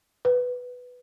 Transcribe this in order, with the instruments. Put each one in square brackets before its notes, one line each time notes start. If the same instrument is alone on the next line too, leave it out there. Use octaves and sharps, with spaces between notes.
[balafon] B4